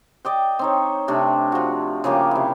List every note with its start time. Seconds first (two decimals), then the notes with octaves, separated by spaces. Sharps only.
0.25 D5 D#5 G5
0.59 C4 D#4 C#5
1.08 C3 A3 D4
1.52 F3 F#4
2.04 C#3 F3 A#3 G4
2.31 C3 E4